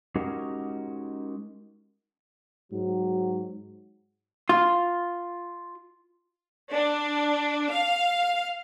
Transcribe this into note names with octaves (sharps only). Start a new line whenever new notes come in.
G#3 C#4 D#4 F#4 G4 A#4
G#2 F#3
F4
D4
F5